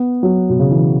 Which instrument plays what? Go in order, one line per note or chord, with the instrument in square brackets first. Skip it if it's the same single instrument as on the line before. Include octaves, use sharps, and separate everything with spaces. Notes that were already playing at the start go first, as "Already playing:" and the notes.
Already playing: [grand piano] B3
F#3
B2
C#3
E3